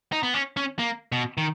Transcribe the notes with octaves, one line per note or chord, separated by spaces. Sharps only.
D#4
B3
C#4
C#4
A#3
B2
D#3